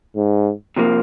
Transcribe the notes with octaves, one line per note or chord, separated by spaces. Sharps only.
G#2
C3 F3 A#3